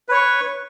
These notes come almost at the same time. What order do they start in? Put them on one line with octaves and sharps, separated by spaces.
B4 C#5 C#6